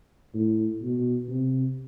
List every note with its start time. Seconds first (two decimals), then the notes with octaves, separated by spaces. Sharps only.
0.34 A2
0.82 B2
1.29 C3